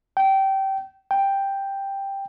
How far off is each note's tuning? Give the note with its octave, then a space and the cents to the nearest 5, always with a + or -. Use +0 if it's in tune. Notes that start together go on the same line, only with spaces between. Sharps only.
G5 -20
G5 +5